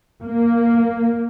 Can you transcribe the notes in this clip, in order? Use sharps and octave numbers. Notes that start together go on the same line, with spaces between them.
A#3